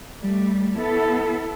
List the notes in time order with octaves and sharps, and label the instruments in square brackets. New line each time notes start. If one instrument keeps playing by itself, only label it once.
[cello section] G3 A3
B3 E4 A4